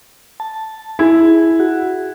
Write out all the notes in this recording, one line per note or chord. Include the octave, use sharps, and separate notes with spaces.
A5
E4 G#4
F#4